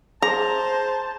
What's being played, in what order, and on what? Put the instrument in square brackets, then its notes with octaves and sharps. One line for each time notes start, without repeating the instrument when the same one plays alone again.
[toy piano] G#4 [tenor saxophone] C5 [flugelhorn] A5 [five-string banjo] A#5